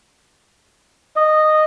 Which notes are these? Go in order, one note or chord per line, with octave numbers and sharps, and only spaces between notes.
D#5